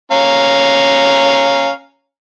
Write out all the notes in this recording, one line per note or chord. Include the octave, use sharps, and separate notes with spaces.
C#4 F5 A#5